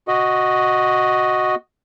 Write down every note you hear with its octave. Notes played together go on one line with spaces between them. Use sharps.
F#4 D#5